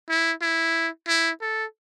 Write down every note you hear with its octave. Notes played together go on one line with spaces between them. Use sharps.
E4
E4
E4
A4